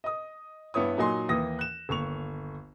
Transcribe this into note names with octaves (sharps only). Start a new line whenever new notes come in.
D#5 D#6
G2 B3 E4 C#5 D#6
A#2 F#3 D#4 D#5 G#5 C6
D#2 E3 E4 D#6 A#6
F#6 E7
G1 D#2 C#6 F7